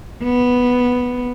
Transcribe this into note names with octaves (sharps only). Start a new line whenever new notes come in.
B3